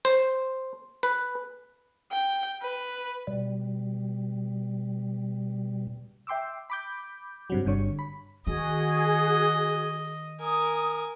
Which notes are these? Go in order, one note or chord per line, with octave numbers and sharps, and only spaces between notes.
C5
B4
G5
B4
B2 G3
E5 G5 C6 D6 E6
B5 D6 G6
G2 C3 F#3
G1 G2 D3 C#5 C#6
B5
D#3 F#4 G#4 D#5
A#4 G#5 D#6